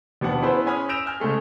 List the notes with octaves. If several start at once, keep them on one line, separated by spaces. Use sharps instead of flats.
D#2 B2 D4 B4 F#5 A5
B3 C#4 E4 G#4 B4 C5
C#4 G#5 B5 D#6 F6
E6 G6 A#6 D7 E7 F7
G#5 F6 G6
C#3 G#3 A3 G#4